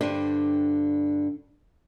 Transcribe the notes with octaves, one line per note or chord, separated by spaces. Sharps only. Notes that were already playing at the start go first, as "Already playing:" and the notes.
G2 D3 D4 G4 C5